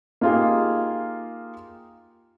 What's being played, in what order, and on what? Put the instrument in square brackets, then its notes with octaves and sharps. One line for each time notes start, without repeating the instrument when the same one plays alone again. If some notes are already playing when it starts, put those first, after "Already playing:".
[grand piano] A#3 D#4 F4 G4 G#4